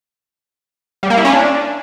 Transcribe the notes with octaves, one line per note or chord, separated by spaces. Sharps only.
G3
A#3
E4
C#4
D4